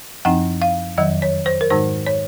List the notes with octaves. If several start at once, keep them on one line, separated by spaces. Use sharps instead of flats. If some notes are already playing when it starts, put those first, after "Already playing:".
F#2 F3 C4 D#4 F#5
F5
F2 D#3 F#3 D#5
C#5
C5
A#4
G#2 D#3 G#3 D#4 C5
C#5